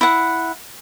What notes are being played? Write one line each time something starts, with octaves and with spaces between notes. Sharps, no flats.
E4 F#5